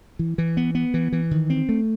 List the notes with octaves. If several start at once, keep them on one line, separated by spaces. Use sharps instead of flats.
E3
E3
B3
B3
E3
E3
D#3
C4
A3